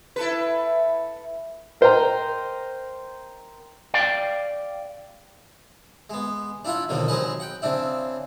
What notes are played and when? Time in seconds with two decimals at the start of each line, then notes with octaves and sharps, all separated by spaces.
0.16 E4 A4 B4
1.81 A#4 C5 D#5 G5 A#5
3.94 D5 F5 G5
6.10 G#3 B3
6.65 D4 E4 F4 E5 F#5
6.89 F2 B2 D3 D#3 F#3 A#3
7.08 F#3 G#3 C4 G#4 B4 D#5
7.40 F#5 G5
7.62 C#3 C4 D4 E4